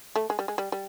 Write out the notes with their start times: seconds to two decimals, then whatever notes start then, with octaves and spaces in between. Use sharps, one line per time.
0.16 A3
0.30 G#3
0.39 G3
0.48 G#3
0.58 G3
0.72 G3